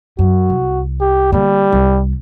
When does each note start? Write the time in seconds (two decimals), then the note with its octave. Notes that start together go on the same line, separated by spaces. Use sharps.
0.19 F#2 F#4
0.50 C2
1.01 G4
1.32 D3 G3 A#3
1.72 C2